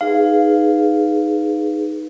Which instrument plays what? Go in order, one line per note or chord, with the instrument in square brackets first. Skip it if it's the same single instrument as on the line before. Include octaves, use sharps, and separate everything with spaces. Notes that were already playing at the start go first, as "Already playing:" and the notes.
[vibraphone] D#4 G#4 B4 [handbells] F5